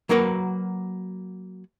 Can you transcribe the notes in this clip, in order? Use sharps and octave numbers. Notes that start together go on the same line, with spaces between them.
F#3 A#3 F#4 A#4 B4